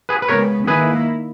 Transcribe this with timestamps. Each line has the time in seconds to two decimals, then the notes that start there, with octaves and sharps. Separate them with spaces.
0.09 G#4 B4
0.22 B4
0.28 C#3 G#3 B3 A#4 C#5
0.67 D#3 A#3 E4 G#4 B4